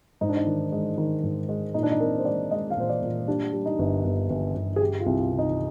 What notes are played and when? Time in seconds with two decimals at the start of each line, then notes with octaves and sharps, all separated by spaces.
0.21 G#2 D#4
0.29 D4
0.36 D#4
0.47 D#3
0.72 G#3
0.98 D#3
1.23 G#2
1.49 G#3
1.74 A#2 D#4
1.83 D4
1.91 D#4
2.00 C4 A#4
2.19 C5
2.25 G#3 D5
2.51 G#3 D#5
2.70 F5
2.76 A#2 C5
2.89 D5
3.02 A#2
3.28 G3 D4
3.53 G3
3.66 D#4
3.79 G1
4.04 G1
4.30 G1
4.55 G1
4.76 G#4
4.81 G3 G4
5.00 F4
5.06 C2
5.19 F4
5.32 C3
5.39 D#4